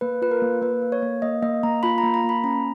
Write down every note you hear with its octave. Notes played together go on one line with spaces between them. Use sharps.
A#3 B4
F4 B4
A#4
A#3
A#3 B4
A#3
C#5
A#3
A#3 D#5
A#3 D#5
A#3 A#5
F4 B5
A#5
A#3
A#5
A#3
B5
C#4 A#5